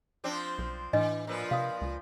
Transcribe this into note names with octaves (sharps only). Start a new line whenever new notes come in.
F3 C4 D4
B1
A2 E3 D4 D#5 G#5
A#2 F3 B4
C3 F5 D#6
C#2